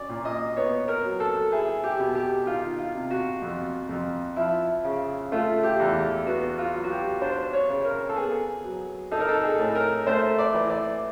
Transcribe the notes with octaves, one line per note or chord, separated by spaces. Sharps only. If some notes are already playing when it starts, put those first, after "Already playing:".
Already playing: F#3 C#4 D5
A#2
D#5
B3 C#5
A#4
F#3
A4
E4 G#4
G4
B2
G4
D#3 F4
F4
C3
F#4
F2
F2
F3 E4
C#3
A3 F4
G4
E2
B3 F#4
F4
F#3
F#4
G4
D4 C5
C#5
C#3
A#4
A4
B3 G#4
F#3
D#4 A4
A#4
A4
G#4
A2
A#4
A3 C5
D5
E3
D5